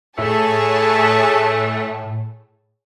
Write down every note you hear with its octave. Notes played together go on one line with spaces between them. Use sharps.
A2 E3 A3 G#4 C#5 A5